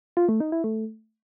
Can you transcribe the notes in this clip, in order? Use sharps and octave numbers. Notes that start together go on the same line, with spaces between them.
F4
A3
D#4
E4
A3